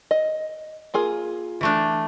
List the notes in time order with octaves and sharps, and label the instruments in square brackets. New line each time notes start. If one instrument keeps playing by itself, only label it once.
[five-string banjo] D#5
A#3 F4 G#4
[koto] E3 A3 D4